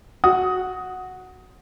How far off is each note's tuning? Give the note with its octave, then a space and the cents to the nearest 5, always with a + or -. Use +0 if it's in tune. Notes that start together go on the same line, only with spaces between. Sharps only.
F#4 +0 D#6 +20